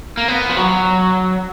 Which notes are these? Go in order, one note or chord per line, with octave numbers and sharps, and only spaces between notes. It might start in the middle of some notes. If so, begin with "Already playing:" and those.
A#3
B3
F3
F#3